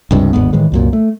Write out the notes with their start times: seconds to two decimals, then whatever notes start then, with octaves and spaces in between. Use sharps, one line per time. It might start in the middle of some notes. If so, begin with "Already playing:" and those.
0.11 C#2 G2 C3
0.33 G1 D#2 G#2 B3
0.53 A2 D#3 E3 G#3
0.72 C2 F#2 A#2
0.93 A3